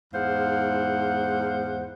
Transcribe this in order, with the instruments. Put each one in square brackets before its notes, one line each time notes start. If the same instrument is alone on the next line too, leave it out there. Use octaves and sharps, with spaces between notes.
[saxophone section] E2 G#2 C5 F5 F#5